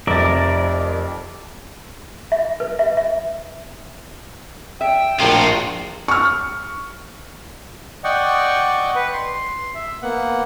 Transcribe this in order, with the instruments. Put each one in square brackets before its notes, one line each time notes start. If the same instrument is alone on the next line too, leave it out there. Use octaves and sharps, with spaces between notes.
[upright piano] F1 F2 A6 [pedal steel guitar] A#4 D5 E5
[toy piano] E5
B4
E5
E5
[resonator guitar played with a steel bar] E5 [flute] G5
[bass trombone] A#1 [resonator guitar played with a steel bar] A2 A#4 [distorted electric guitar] F4 F#4
[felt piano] C#6 F6
[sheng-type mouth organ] D5 D#5 F#5 G5 C#6
B4
C6
E5
A#3 B3 F#5